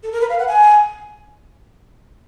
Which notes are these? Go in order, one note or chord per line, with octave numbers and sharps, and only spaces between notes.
A4
A#4
B4
F5
F#5
G#5